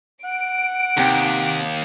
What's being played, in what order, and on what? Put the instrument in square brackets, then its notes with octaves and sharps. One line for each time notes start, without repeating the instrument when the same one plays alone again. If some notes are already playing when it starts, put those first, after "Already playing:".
[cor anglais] F#5 [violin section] D7
[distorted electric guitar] D#2 [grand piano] C3 G5